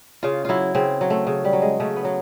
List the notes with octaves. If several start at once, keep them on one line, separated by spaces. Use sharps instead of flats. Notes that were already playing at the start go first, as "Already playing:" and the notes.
C#3 F4
F#3 E4 F4
C#3 C4
F#3
A3
C#3
G3
F#3
G#3
C#3 A3
B3
F#3